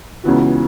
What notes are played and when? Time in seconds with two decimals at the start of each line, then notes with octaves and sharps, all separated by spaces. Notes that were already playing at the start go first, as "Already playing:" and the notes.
0.24 C#2 C#3 E3 B3 F#4